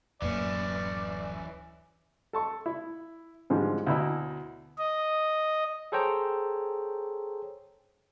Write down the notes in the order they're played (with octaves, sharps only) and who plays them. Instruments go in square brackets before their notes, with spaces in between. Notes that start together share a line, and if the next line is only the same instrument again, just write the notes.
[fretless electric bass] D1 F#2 A#3 [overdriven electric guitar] E3 C#4 [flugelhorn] D5
[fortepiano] A4 A5 C#6
E4
G#2 D3 E3 F3 G3 G#3
D2 B2 E4 A#5 E6
[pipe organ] D#5
[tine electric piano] G#4 A4 C5 C#5 G5 A#5